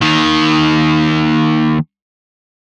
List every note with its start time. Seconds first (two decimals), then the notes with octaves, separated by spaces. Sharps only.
0.02 D#2 D#3